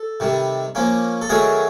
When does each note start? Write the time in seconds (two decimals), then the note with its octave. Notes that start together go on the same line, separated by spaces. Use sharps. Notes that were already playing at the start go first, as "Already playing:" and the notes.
Already playing: A4
0.20 C3 D#3 G3
0.75 F3 A#3 C#4
1.21 A4
1.30 D#3 F#3 A3 G#4 A#4